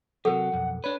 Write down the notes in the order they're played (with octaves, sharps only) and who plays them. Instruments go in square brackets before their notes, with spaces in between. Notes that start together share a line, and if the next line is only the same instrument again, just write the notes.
[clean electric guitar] C3 F3 F#3 [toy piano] A4 A#4 [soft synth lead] F#5
[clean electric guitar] B1 F2
[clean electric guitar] D4 B4 [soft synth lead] C#5